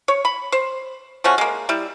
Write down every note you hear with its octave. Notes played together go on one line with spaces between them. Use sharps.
C#5
B5
C5
F3 A3 C#4 F#4
G#3 A#3
G3 E4